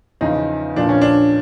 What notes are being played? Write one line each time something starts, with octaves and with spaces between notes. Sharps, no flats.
E2 C#3 F3 D#4
A#1 A#2 F3 D4
C#4
D4